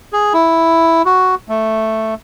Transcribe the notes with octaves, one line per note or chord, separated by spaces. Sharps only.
G#4
E4
F#4
A3